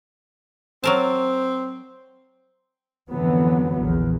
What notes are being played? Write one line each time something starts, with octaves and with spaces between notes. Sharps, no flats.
F#3 C4 A#4 A5
F2 G#2 D3 E3 F#3 B3
A#1 E2